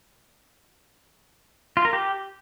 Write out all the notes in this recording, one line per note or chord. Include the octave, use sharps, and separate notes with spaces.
F4
A#4
G4